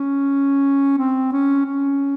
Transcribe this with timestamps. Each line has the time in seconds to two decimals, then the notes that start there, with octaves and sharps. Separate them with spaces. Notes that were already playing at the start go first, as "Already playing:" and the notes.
Already playing: C#4
0.98 C4
1.32 C#4
1.65 C#4